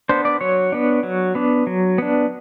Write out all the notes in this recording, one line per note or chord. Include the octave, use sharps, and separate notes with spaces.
B3 D4 C5
D5
F#3 C#5
B3 D4
F#3
B3 D4
F#3
B3 D4